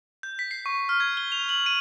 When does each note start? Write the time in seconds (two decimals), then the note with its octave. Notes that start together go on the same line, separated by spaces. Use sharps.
0.23 G6
0.39 B6
0.51 C7
0.66 C#6
0.89 F6
1.00 G#6
1.17 G7
1.32 F7
1.49 F#7
1.66 D#7